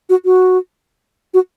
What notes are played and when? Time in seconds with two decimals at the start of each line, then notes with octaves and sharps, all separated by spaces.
0.09 F#4
0.25 F#4
1.34 F#4